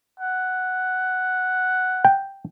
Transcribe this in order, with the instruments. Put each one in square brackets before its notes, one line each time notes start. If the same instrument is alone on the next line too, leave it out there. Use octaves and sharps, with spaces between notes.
[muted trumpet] F#5
[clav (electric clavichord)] G5